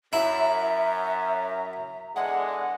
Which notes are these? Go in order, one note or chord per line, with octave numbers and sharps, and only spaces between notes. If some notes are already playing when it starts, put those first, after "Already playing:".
F#2 E4 E5 A#5
E2 D3 G#3 F#5